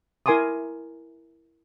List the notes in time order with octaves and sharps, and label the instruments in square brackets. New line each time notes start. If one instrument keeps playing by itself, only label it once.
[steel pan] E4 A#4 G#5 C6 D6 D#6